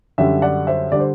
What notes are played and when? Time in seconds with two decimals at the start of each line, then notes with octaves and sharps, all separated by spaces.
0.18 F#2 D3 G3 E5 G5
0.42 D5 F#5
0.67 C5 E5
0.92 D3 G3 D5
1.00 C5